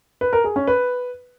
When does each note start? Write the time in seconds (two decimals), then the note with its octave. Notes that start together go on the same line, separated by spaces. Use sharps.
0.21 B4
0.33 A#4
0.44 G#4
0.56 C#4
0.67 B4